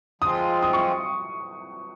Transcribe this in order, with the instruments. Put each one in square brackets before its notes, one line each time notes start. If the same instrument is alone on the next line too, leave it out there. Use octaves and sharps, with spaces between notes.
[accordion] F3 G#3 C4 F4 [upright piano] D#6
[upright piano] D#6
C#6